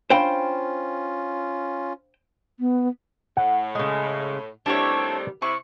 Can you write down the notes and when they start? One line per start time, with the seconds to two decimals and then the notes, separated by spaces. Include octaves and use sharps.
0.10 C#4 D4 F4 C5 F5 G5 B5
2.60 B3
3.37 A2 F#5
3.75 C#3 G#3
4.66 A2 D#3 G3 B3 C4 D4 E4 C#5
5.42 C3 E4 C#6